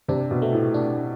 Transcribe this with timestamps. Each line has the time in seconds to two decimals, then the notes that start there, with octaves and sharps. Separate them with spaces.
0.08 C3 D4
0.31 B2
0.42 A3
0.53 A2
0.74 D4